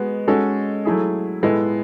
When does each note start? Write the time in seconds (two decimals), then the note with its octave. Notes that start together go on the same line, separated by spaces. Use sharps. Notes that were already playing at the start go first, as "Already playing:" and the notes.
Already playing: G#3 B3 F#4
0.28 G#3 C#4 F#4 A4
0.85 F#3 A3 E4 G#4
1.43 A2 G#3 B3 E4 A4